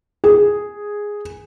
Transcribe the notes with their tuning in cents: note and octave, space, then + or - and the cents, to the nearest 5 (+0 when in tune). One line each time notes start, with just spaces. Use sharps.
G#4 -5